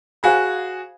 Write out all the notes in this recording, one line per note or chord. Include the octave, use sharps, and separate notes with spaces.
F#4 G#4 C5 F5 G#5 B5